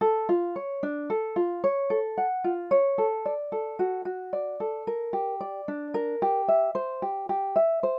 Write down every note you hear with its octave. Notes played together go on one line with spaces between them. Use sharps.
A4
F4
C#5
D4
A4
F4
C#5
A4
F#5
F4
C#5
A4
D5
A4
F#4
F#4
D5
A4
A#4
G4
D5
D4
A#4
G4
E5
C5
G4
G4
E5
C5